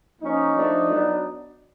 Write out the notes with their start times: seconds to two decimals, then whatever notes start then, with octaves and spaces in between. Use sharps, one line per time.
0.21 F3 A#3 C#4 D#4
0.54 F3 A3 D4
0.88 F#3 B3 D4